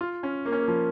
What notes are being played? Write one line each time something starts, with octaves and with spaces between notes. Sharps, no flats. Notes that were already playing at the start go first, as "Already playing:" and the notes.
F4
C#4
A#3
C#4
A#3
F3